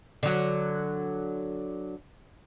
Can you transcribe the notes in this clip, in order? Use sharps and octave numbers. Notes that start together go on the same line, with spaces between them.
D3 F#3